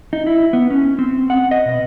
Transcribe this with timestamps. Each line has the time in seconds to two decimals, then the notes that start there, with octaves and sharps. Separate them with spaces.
0.13 D#4
0.26 E4
0.53 B3
0.70 C#4
0.99 C4
1.30 F#5
1.51 D#5
1.65 B2